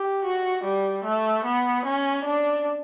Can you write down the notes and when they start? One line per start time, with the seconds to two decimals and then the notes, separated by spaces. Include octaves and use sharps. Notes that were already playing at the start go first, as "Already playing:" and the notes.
Already playing: G4
0.25 F#4
0.64 G3
1.04 A3
1.45 B3
1.85 C#4
2.25 D4